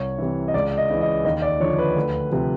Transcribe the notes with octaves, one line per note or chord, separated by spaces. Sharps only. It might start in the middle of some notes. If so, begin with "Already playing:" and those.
Already playing: C2 C#5
C3 E3
D#5
C#2 D5
D#5
C#3 E3
D#5
D#2 D#5
D5
D3 F3 C#5
B4
D2
C3 F3